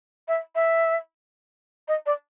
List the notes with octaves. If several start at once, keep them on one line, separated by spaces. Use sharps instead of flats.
E5
E5
D#5
D5